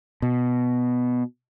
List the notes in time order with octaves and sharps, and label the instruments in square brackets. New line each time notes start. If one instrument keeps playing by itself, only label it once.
[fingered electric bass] B2